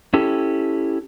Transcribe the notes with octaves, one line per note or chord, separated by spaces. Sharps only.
C#4 E4 G4 A4